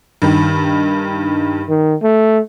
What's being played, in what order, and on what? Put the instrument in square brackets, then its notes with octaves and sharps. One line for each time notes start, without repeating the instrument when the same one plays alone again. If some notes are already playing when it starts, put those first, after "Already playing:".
[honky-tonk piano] G2 D#3
[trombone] D#3
A3